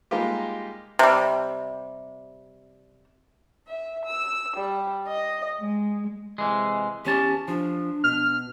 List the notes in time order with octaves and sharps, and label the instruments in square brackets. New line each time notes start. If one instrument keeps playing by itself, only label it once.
[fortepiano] G3 G#3 A#3 D#4 F4 G4
[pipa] C3 G3
[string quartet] E5
E6
G3
D#5
G#3
[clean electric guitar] C3 E3 G#3
[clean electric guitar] E2 C#4 A5 [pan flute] G4
[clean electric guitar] F3 [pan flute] D4
[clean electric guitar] B2 [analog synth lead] F6